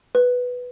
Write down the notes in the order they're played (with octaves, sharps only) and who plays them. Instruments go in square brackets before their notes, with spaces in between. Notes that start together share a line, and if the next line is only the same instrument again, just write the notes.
[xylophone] B4